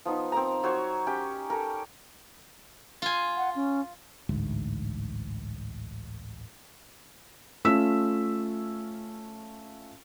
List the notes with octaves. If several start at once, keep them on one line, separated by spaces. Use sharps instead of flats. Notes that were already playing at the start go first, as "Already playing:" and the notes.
F3 B3 D#4
C4 A#4 A#5
F#3 C5 C#5
C#4 G4 G5
A4 A#4
F4 G#5
F#5
C#4
A1 D2 G#2
A3 C#4 F4 E6 B6 E7